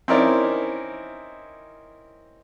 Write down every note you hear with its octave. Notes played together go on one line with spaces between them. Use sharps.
C4 C#4 D#4 E4 A#4 D5